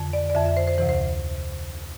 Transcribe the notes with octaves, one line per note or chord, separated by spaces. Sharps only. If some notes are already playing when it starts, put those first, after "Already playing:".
Already playing: F2 D3
D5
D5
F2 D3 E5
E5
C5
C5
D2 C3 E3 C5
C5